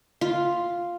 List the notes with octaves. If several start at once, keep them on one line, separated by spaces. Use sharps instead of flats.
F4